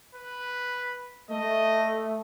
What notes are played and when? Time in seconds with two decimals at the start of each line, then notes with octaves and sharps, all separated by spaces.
0.15 B4
1.31 A3 D#5